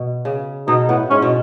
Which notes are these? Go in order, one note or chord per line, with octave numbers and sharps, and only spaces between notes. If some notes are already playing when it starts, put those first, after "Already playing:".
Already playing: B2
C#3
B2 D#4
A2 B3
G#2 C#4
B2